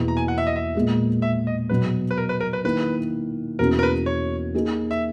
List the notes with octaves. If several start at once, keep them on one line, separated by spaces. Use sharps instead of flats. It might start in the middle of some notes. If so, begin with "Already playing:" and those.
Already playing: E2 B2 A#3 E4 B4
A#5
G#5
F#5
E5
D#5
E5
A#2 G#3 B3
E5
D#5
B2 F#3 B3 B4
B4
A#4
B4
A#4
B4
D#3 A#3 E4 B4
E2 B2 A#3 C#4 F#4 A#4
A#4
B4
C#5
A#3 D#4 G#4
E5